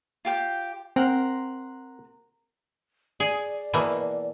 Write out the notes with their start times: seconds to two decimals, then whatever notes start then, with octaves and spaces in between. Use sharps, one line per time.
0.25 F4 G4 G5
0.96 C4 A#4 F#5 C6
3.20 G#4 D5
3.73 B2 E3 A#3